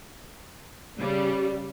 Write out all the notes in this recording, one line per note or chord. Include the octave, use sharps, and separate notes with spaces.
C#3 G3